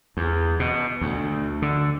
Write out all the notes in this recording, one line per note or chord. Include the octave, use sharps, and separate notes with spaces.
E2
B2
D2
D3